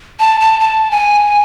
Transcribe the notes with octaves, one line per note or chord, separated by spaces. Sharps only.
A5
A5
A5
G#5